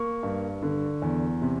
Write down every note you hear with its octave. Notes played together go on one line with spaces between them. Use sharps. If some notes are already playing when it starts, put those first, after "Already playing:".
Already playing: A#3 C#6
G2
D3
E2
C3